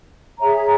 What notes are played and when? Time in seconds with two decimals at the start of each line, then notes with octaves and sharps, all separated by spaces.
0.39 G#4 C#5 E5 A#5